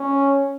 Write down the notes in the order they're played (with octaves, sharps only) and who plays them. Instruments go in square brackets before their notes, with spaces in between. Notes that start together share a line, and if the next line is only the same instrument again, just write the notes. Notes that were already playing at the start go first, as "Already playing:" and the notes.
Already playing: [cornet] C#4